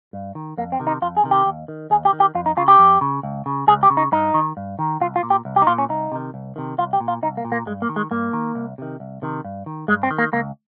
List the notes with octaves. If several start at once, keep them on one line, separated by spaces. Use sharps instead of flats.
G2
D#3
F2 A#3
C4
C3 D#3
D#4
F2 F4
G#4
C3 D#3
G4
D#2
D#3
D#2 G#4
G4
D#3
G4
F2 F4
D#4
C#3 F4
G4
F2
C#3
C#2
C#3
C#2 G#4
G4
C#3
D#4
G2 D#4
D#3
G2
D#3
C2 F4
F4
A#2
G4
C2
G4
D#4
A#2 F4
C#4
C2 D#4
C3 D#3
C2
C3 D#3
C2 F4
G4
A#2
F4
C2 D#4
A#3
A#2
A#3
G2 G#3
A#3
D#3
G#3
G2 A#3
D#3
C2
C3 D#3
C2
C3 D#3
G2
D#3
G2 G#3
C4
D#3
A#3
C#2 A#3